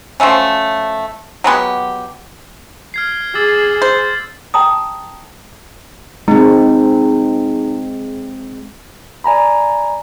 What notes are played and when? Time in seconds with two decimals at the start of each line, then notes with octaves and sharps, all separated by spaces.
0.20 F3 F#3 A3 C#4
1.44 F#3 G#3 B3 G4
2.94 F6 G#6 C7
3.35 G#4 D6 E6 A6
3.82 C5
4.54 G5 A5 A#5 D#6
6.28 G#3 C4 D#4
9.24 D5 G#5 A#5 B5